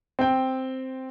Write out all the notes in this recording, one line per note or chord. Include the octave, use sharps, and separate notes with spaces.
C4 G5